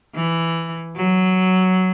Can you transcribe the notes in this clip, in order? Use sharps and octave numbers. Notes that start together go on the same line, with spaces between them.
E3
F#3